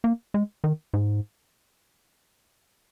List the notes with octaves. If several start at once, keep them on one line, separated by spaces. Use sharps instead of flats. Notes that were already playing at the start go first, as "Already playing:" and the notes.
A#3
G#3
D#3
G#2